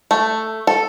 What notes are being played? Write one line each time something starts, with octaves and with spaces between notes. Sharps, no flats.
A3
A4